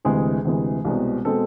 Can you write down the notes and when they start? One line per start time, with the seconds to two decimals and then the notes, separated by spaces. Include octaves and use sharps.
0.05 D2 C3 E3 G#3 G#4
0.45 D2 C3 E3 G#3
0.85 C2 B2 G#3 C4
1.25 B2 G#3 C4 A4